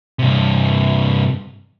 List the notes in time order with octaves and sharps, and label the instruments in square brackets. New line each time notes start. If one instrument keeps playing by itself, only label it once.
[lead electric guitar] G2 C3